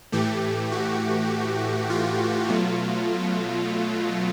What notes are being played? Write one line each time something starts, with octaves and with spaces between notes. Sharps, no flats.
A2 E3 A3 G4
F#4
F4
B2 F#3 A3